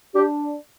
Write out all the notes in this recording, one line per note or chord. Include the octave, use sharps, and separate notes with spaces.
D4 G4